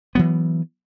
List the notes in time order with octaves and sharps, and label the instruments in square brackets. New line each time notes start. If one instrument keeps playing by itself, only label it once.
[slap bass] E3 F#3 B3